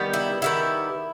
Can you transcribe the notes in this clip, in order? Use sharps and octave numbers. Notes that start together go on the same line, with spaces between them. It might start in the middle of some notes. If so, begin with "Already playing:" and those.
Already playing: D#3 G3 B3
E4
D#3 G3 B3 E4